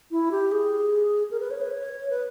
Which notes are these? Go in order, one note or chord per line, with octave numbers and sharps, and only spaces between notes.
E4
G4
G#4
A#4
B4
C#5
B4
C#5
B4